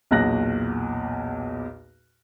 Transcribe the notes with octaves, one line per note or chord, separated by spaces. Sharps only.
B1 E2 A#2 F#6 A#6